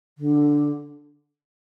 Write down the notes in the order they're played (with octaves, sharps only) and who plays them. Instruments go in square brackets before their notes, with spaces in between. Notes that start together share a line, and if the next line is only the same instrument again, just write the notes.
[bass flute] D3